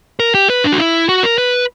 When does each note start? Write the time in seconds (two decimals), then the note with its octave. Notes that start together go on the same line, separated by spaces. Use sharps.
0.20 A#4
0.35 G4
0.50 B4
0.64 D4
0.72 F#4
0.79 E4
1.09 F#4
1.23 A#4
1.38 B4